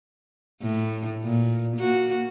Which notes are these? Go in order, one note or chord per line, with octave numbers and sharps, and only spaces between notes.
A2
A#2
A#3 F#4